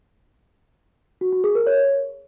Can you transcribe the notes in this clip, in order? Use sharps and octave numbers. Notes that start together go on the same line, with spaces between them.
F#4
F#4
G#4
A#4
C#5